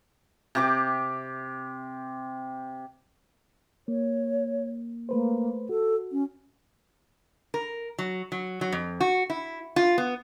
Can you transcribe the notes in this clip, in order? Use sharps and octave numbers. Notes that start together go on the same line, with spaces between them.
C3 G4 D6
A#3 C#5
A3 A#3 B4 C5
F#4 A4
C#4
A#4
F#3
F#3
F#3
F2
F#4
E4
F4
B3